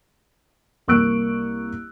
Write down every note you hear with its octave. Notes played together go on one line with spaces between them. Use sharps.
C2 A#3 C#6 E6 F#6 D7